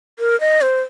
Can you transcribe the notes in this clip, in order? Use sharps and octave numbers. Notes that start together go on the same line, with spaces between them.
A#4
D#5
C5